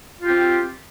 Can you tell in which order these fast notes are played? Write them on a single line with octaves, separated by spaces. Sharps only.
F4 G4 C4